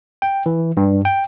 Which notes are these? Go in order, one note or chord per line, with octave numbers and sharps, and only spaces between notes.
G5
E3
G2
G5